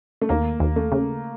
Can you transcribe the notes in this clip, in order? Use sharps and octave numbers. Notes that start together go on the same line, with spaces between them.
A3
D#2 A#3
D#2
A3
C#3